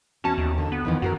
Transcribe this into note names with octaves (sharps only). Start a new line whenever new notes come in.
E2 C#4 F#4 A5
D#2
D3
B3
F2 D#3 E3
F#2 F#4 G4 A#4